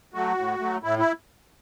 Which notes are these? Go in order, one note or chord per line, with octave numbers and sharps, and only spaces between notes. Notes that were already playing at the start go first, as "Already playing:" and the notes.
F#3 A3 F#4
A2
F#3 A3
A2 E4
E4